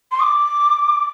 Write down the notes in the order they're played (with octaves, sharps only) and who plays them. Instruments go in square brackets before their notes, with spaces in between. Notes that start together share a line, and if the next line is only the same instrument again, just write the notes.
[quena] C6
D#6
D6